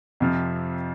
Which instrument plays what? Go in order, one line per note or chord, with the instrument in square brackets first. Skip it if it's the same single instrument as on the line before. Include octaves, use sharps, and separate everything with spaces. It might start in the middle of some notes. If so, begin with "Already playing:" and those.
[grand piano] F2 C3 F3